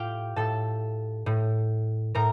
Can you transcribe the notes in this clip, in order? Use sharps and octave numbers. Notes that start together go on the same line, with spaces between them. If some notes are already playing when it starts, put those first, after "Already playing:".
Already playing: A2 F4 G4 F5 G5
A2 A4 A5
A2
A2 A#4 A#5